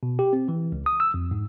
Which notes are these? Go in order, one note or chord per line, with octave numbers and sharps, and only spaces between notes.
B2
G4
C4
E3
C#2
D#6
E6
F2
G#2